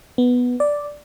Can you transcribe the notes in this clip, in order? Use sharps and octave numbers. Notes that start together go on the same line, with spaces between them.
B3
D5